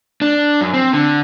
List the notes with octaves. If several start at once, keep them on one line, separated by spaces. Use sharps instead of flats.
D4
F#2
C4
D3